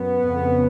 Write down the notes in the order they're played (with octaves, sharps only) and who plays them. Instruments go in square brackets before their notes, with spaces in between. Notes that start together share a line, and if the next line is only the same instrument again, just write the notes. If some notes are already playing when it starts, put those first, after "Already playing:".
Already playing: [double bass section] F#2 B3
F2 C#3